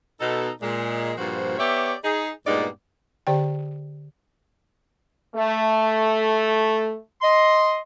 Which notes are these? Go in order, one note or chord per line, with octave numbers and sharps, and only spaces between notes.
B2 D#4 A4
A#2 G#3
G2 A#2 F3 F#4 C5
B3 G4 C#5 D5 E5
D#4 G#4
G2 A#2 G#3 B3 D#4 D5
D3 G4 C5 D5 G5
A3
D#5 C6